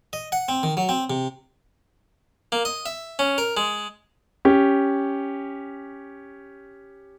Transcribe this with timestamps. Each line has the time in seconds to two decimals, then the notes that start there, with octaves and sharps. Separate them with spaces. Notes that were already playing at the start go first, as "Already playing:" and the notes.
0.13 D#5
0.32 F#5
0.49 C4
0.63 D#3
0.77 F#3
0.89 C4
1.10 C3
2.52 A#3
2.65 D#5
2.86 E5
3.19 C#4
3.38 A#4
3.57 G#3
4.45 C#4 G4